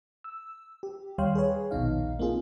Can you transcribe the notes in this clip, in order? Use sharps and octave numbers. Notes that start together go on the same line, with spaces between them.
E6
G4
D#2 G3 C#5 F5 G5 C6
G#4 B4 C#5
A#1 D#2 B2 D#4 F5
A#3 C4 F4 G#4